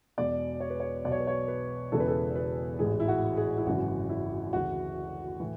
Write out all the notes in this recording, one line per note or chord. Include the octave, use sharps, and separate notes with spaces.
E1 E2 B2 D5
C#5
B4
C#5
B1 B2 C#5 D5
B4
C#5
B4
E1 E2 C#3 E3 A4
B4
A4
B4
A1 G#2 E3 G#4
E4
F#4
G#4
E4
G#1 F#2 C#3 E3 F#4
E4
D2 C#3 E3 F#4
A2 E3